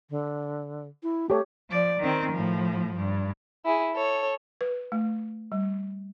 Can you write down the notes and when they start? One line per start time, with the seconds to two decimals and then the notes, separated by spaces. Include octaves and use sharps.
0.10 D3
1.03 E4
1.30 A3 G4 C#5
1.70 F3 D5
2.00 D#3 C4
2.32 A2 F3
2.97 G2
3.65 E4 G#4
3.95 A4 C#5
4.61 B4
4.92 A3
5.52 G3